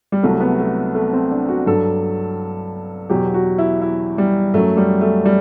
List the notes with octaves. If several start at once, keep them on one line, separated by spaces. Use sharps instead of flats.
G3
C2 C3 F#3 A3
B3
A3
A3
C4
D4
F#4
G2 F#3 A4
E2 B2 F#3 G4
F#4
E4
E4
G3
F#2 F#3 A3
G3
A3
G3